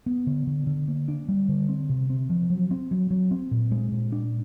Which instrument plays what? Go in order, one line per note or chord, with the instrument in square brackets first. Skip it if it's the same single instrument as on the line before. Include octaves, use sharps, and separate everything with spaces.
[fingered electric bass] B3
D3
D3
D3
A#3
D4
G3
D3
C4
C3
C4
F3
F#3
C4
F#3
F#3
C4
A#2
G#3
A#2
D4